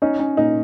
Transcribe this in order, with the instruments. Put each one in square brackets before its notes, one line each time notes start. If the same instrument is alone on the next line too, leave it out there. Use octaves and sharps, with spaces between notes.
[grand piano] C#4 [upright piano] D#4
[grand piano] C#4
[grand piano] A#2 [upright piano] D#4